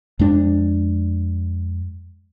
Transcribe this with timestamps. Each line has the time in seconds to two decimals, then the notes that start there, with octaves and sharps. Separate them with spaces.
0.19 F2 G#3 D4